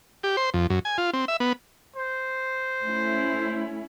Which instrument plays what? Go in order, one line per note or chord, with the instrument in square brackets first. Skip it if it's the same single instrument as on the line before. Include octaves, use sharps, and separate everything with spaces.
[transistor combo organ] G4
C5
F2
F#2
G#5
F4
C4
E5
B3
[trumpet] C5
[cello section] A3 C#4 E4